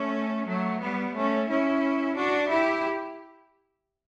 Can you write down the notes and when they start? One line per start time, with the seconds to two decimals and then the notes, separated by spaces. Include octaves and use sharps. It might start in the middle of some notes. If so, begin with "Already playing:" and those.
Already playing: A3 C#4
0.48 F#3 A3
0.82 G3 B3
1.15 A3 C#4
1.49 C#4 E4
2.16 D4 F#4
2.51 E4 G4